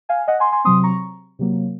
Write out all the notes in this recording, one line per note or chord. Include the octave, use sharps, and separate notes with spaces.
F5 G#5
D#5 F#5
G#5 C6
G#5 C6
C3 F#3 C4 C6 D#6
A#5 C#6
C3 F#3 A#3